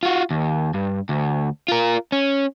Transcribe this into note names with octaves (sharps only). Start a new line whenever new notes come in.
F4 F#4
D#2
G2
D2
F4 A#4
C#4